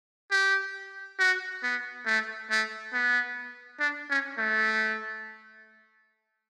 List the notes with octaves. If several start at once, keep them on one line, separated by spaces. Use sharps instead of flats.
G4
F#4
B3
A3
A3
B3
D4
C#4
A3